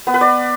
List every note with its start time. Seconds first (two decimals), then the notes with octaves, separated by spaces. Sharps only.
0.07 B3
0.14 B4
0.21 D5